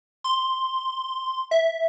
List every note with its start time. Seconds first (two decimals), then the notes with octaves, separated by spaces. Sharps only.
0.24 C6
1.51 E5